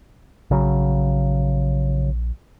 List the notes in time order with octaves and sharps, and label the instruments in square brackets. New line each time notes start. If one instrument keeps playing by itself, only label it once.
[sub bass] A#1 [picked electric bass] C#3 F#3